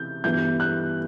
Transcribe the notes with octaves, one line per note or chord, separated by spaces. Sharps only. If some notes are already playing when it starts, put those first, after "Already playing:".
Already playing: C3 E3 G6
G2 E3 G3 B3 G6
F#6